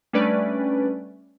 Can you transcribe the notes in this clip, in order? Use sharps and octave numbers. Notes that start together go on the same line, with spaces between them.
G3 A3 C#4 D4 B4 D5